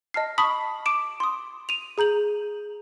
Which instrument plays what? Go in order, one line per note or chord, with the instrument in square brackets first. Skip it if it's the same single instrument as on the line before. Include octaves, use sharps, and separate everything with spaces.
[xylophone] D#5 A5 F6 C7
A5 B5 C#6 D#6 B6 F#7
D6 D7 E7
C6 D#6
D#7 F7
G#4 A#5 G6 F#7